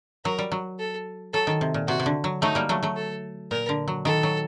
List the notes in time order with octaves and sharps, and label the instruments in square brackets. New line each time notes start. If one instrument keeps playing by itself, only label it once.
[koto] F#3 [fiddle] A#4
[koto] G3
F#3
[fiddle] A4
[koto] F#3 [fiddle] A4
[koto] D#3
C3
A#2
[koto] C3 [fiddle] F#4
[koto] C3
D3
F#3
[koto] F#3 A3 [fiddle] D#4
[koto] G3 A#3
F#3 A3
F#3 A3
[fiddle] A4
[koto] A#2 [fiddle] A#4
[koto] D3
F#3
[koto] D#3 [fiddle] A4
[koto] F#3